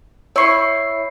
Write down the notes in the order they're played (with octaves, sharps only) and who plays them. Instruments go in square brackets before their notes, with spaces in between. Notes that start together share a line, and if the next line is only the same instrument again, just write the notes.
[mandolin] E4 C#6 [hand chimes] C#5 C7